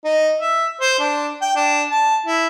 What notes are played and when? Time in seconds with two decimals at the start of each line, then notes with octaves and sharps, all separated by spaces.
0.05 D#4
0.40 E5
0.81 C5
0.99 D4
1.41 G5
1.56 D4
1.90 A5
2.26 E4